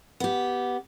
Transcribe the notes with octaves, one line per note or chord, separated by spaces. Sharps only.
B3 G4